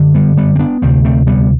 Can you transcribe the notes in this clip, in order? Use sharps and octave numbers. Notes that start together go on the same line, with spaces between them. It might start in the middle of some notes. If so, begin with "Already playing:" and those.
Already playing: F#2 D3
G3 B3
G3 B3
C4
B3 D4
D2 C3 A3 C4
A3 C4
G3 B3